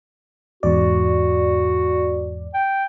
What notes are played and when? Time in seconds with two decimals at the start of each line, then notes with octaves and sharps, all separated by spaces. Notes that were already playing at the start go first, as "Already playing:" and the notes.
0.63 E2 G#2 F#4 D5
2.54 G5